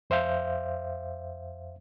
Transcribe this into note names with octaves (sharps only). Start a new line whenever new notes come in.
F2 C5 E5 F5 G6